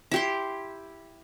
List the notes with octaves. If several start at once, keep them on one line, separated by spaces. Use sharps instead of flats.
E4 G4 C6